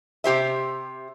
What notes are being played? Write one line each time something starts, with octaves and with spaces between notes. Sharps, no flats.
C3 G4 C5 E5